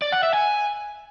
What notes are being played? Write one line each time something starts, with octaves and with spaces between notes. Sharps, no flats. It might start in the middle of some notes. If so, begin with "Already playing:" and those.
D5
F#5
E5
G#5